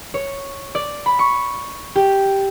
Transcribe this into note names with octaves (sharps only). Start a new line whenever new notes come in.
C#5
D5
B5
C#6
G4